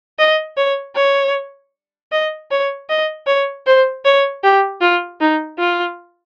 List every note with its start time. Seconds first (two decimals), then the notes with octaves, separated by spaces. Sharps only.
0.19 D#5
0.57 C#5
0.95 C#5
2.12 D#5
2.51 C#5
2.89 D#5
3.27 C#5
3.66 C5
4.05 C#5
4.43 G4
4.81 F4
5.21 D#4
5.59 F4